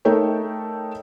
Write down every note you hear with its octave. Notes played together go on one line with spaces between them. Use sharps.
A3 D#4 A4 A#4 C#5 G5